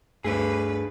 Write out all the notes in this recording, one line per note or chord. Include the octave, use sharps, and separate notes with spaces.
D2 G2 D3 A3 G#4 B4